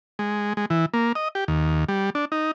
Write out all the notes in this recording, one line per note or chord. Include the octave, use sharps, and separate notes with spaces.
G#3
G#3
E3
A#3
D#5
G4
D#2
G3
D4
D#4